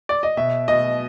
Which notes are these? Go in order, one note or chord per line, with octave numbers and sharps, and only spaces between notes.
D5
D#5
B2 E5
B2 D#5